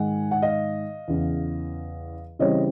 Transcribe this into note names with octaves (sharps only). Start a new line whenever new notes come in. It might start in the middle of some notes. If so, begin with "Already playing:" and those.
Already playing: G#2 D#3 G#3 F#5 G#5
F#5
D#5 F5
E2 C#3 E3
C#3 E3 G3 C4 C#5 D#5